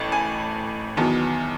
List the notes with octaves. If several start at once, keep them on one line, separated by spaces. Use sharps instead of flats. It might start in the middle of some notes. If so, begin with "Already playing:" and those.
Already playing: A1 A2 A5
G#5
E2 D#3 F#3 B3 A5